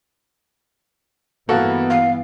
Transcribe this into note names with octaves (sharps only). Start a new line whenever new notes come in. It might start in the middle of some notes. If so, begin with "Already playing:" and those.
G2 E3 A#3 B3 F#4 A4
F5